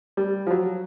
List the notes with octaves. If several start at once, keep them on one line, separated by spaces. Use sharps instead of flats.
G3
F3
F#3